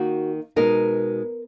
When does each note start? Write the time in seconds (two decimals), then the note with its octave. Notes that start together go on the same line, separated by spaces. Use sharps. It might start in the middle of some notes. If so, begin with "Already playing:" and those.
Already playing: D#3 A#3 D#4 F#4
0.56 B2 G#3 D#4 A#4